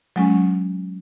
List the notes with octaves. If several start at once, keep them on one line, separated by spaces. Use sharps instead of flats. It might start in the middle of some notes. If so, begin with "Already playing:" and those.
F#3 G#3 C#4